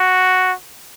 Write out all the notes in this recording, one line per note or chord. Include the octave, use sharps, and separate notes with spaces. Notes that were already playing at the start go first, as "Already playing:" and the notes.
Already playing: F#4